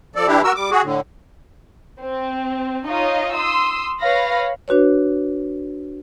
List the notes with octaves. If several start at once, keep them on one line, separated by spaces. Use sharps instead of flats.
F3 A4 D5
E3 D4 E4 G4
F#4 A#4 E6
G3 D6
F#4 G#4
A2 D3
C4
D#4 F4 C#5 D#5 F5
C6 D#6 E6
B4 C#5 F5 B5 A#6
D4 F#4 B4 C#5